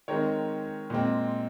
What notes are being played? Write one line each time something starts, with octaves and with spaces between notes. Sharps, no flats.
D#3 G#3 C4 A#4 C#5
A#2 G#3 C4